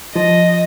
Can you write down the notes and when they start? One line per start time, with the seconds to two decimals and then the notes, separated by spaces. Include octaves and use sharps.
0.15 F3 F4 D#5